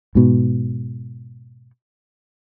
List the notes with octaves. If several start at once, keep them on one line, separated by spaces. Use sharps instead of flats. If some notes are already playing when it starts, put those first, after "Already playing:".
G#2 B2